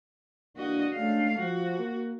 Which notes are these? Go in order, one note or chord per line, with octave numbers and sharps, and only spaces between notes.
E3 A#3 D4 F#4 D#5
G#3 A3 C#4 D4 F5
F3 F#4
A#3